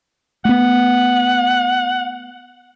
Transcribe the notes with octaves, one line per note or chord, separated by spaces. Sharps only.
A3 B3 F#5